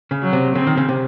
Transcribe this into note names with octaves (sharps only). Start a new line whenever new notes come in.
C#3
F#3
C3
C#3 C4
D#3
C#3
C3